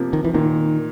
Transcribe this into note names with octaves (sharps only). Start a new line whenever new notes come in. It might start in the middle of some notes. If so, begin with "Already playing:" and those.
Already playing: C3 F3 A#3
D#3
E3
A#2 D#3